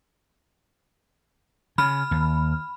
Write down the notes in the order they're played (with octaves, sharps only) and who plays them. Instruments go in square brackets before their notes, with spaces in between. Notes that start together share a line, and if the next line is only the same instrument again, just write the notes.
[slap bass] C#3 [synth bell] B5 F6
[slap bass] D#2